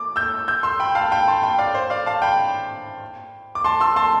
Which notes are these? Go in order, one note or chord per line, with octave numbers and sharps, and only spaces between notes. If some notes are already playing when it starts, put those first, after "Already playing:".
Already playing: D6
E6 G6
E6 G6
C6 E6
G5 B5
F5 A5
G5 B5
A5 C6
G5 B5
D5 F5
C5
D5 F5
F5 A5
G5 B5
D6
A5 C6
C6 E6
A5 C6